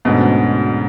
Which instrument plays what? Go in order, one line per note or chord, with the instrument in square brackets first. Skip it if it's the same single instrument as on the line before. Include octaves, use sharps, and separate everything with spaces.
[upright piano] D2 D3 A3 C#4 F#4 [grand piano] G#2 B2